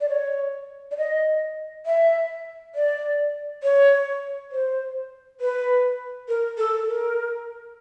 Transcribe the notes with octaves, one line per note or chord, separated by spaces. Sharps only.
D5
C#5
D5
D#5
E5
D5
C#5
C5
B4
A#4
A4
A#4